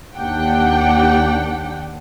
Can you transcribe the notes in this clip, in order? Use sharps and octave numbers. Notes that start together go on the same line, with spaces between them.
D#2 D4 G4 F#5 G5